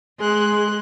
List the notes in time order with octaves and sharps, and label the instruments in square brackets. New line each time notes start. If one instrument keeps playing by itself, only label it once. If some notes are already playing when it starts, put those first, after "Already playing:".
[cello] G#3 [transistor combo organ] G#4 [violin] C6 F#6